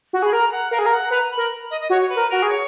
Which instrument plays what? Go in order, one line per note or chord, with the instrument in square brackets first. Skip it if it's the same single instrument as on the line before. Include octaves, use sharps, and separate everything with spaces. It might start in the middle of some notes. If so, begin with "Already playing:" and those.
[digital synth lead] F#4
[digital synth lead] G#4 [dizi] B5
[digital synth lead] A#4 [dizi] A#5
[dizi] F#5
[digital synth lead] A#4 [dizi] F5
[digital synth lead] G#4
[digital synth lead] A#4 [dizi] F5
[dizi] F#5
[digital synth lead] B4 [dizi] A#5
[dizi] B5
[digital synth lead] A#4
[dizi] D#5
D#5
[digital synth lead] F#4 [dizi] C#5
[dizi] C#5
B4
[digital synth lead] A#4
[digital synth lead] F#4 [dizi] A#4
[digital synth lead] G#4
[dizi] C#5